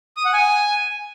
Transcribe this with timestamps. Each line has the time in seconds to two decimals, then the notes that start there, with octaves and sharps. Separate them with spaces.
0.17 D#6
0.25 F#5
0.33 G#5